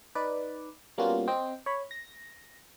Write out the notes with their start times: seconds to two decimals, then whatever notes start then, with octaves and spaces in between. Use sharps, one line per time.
0.15 D#4 B4 D5
0.98 G3 A#3 B3 C#4 F4 F#4
1.28 C4 C5 D#5 G5
1.66 C#5 B5
1.91 A#6